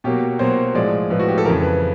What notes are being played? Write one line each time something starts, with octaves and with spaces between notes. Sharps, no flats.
B2 F#3 A#3 G4
B2 F#3 A#3 C5
A2 F3 G#3 D5
A2 F3 G#3 B4
F#4
G4
A4
F2 C#3 E3 A#4
B4